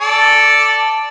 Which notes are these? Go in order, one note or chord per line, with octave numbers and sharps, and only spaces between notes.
A4 D5